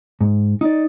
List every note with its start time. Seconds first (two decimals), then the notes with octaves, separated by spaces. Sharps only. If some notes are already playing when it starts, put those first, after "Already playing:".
0.21 G#2
0.61 D#4 D5